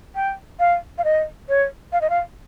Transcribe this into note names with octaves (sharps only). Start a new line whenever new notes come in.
G5
F5
F5
D#5
C#5
F5
D#5
F5